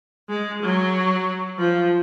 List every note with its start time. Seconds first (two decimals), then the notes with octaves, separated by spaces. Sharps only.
0.29 G#3
0.63 F#3
1.59 F3